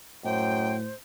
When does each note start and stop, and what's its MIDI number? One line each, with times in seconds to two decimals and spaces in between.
0.24 0.79 42
0.24 0.88 45
0.24 0.94 72
0.24 0.76 79